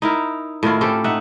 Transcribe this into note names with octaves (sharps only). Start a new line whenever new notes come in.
D#4 E4 A#4
A2 D#3 E4 F4
C4 C#4 G4 A4
D#4 E5 F#5